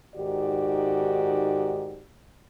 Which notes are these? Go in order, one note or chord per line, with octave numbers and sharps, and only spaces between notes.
G#2 D#3 F#4 G4 D5